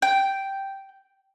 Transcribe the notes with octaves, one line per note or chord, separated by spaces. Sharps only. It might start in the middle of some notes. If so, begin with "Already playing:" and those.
G5